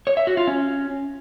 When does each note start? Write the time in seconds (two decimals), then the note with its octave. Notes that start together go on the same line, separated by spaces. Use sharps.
0.07 C#5
0.17 E5
0.27 F#4
0.37 F4
0.47 C#4